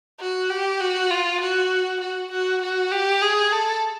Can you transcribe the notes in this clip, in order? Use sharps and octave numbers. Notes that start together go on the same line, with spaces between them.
F#4
G4
F#4
F4
F#4
F#4
F#4
F#4
G4
G#4
A4